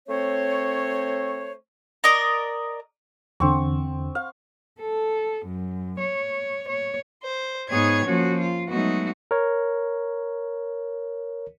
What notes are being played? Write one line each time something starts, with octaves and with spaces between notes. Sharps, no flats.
A3 C4 C5 C#5
A#4 D5 D#5 A#5
E2 D3 C4 C#6
F5
A4
F#2
C#5
C#5
C5
G#2 B3 D#4 G#4 C#5 G#6
F3 A#3 C#4 F#4
F4
F#3 G#3 A3 B3 D#4 F#4
A#4 C#5